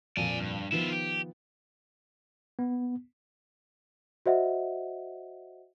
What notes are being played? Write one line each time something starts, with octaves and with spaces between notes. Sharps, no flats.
F2 A#2 D5 G#5
G2
D#3 F3 B3 E4 F4
G4
B3
F#4 C5 D#5 E5 F#5